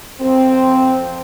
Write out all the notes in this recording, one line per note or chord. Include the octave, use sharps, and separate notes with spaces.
F2 C4